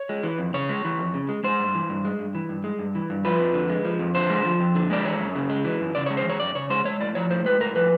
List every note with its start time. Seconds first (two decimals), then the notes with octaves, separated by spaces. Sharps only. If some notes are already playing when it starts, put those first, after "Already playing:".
Already playing: C#5
0.09 G#3
0.23 E3
0.39 F2
0.54 C#3 C#5
0.69 G#3
0.84 E3
0.99 F2
1.14 C#3
1.29 G#3
1.44 G#3 C5
1.59 G2
1.75 E3
1.89 G2
2.05 G#3
2.19 G2
2.35 E3
2.49 G2
2.64 G#3
2.79 G2
2.95 E3
3.10 G2
3.25 F3 B4
3.40 F2
3.54 D3
3.70 G#3
3.85 F3
3.99 F2
4.15 D3 C5
4.30 G#3
4.45 F3
4.60 F2
4.75 D3
4.90 G#3 D5
5.05 E3 C#5
5.19 F#2
5.36 C#3
5.50 G#3
5.65 E3
5.80 F#2
5.95 C#3 D5
6.06 C#5
6.10 G#3
6.17 C5
6.25 E3 C#5
6.40 F#2 D5
6.55 C#3 C#5
6.70 G#3 C5
6.85 G#3 C#5
7.00 A2 D5
7.15 F3 C#5
7.30 A2 C5
7.45 G#3 B4
7.60 A2 A#4
7.76 F3 B4